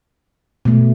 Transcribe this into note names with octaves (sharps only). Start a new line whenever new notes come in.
B2 A3